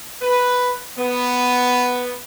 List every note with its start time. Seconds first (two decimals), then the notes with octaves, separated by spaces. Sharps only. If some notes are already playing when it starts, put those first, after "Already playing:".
0.21 B4
0.98 B3